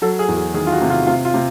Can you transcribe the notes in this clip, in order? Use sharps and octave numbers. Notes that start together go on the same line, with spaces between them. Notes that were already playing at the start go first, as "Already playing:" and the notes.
F#3 A4
G#4
E2
G#4
D#3 G#4
F4
F#4
C3
F4
C3 F4
F4
C3